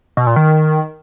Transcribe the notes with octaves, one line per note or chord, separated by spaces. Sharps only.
B2
A#2
D#3